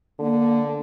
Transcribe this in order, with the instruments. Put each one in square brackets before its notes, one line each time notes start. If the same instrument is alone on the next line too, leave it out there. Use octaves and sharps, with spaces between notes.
[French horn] D3 [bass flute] A#3